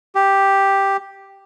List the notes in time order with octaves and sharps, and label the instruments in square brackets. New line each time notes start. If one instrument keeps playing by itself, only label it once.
[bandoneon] G4